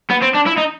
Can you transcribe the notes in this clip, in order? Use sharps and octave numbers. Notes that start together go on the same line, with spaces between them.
B3
C4
D4
E4
D#4